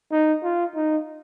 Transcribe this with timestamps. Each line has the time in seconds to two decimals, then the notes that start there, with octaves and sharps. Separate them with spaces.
0.12 D#4
0.43 F4
0.75 D#4